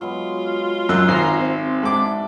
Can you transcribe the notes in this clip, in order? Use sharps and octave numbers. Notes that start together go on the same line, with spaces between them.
F#3 G#3 B3 F4
F#2 D#4 F#4 E6 F#6
G#1 A#5 C7
C4
G#2 D4 E5 A5 D6